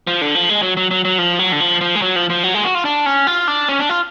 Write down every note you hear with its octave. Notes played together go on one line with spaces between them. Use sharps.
F3
D3
F3
G#3
F#3
F#3
F#3
F#3
F3
F#3
D3
F3
F3
G#3
F#3
F3
F3
F#3
G#3
F#4
F4
D4
C#4
F4
D4
C#4
D4
F4